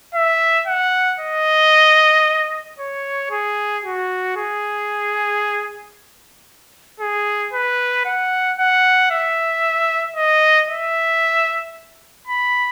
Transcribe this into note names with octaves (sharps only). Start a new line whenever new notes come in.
E5
F#5
D#5
C#5
G#4
F#4
G#4
G#4
B4
F#5
F#5
E5
D#5
E5
B5